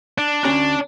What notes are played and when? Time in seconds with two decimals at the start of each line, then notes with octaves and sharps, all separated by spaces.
0.18 D4
0.44 D2 C#4 D4 A#5